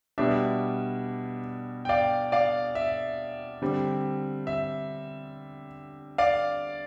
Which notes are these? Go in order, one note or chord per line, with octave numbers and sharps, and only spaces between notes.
B2 G3 D4 E5
G5
D5 F5
D5 F5
E5
D3 G3 C4
E5
D5 F5